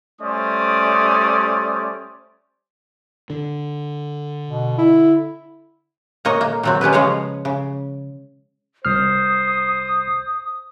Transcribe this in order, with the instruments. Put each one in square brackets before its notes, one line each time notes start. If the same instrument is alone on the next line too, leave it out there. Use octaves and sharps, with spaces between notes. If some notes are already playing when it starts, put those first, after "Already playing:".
[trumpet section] G3 A3 C#4 C5 D5 D#6
[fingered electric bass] D3
[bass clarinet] B2
E4
[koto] A#2 A#3 C#5 D#5
A#3
A#2 F#3 C4
G#3 C#4 G4 B4
C#3 F3 G#3 C#5 F5
C#3
[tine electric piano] C2 F6 [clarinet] C5 [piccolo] D#6